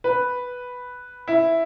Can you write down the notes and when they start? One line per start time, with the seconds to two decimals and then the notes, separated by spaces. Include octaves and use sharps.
0.04 B4
1.28 E4